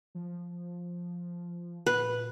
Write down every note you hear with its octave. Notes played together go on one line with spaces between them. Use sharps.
F3
A#2 B4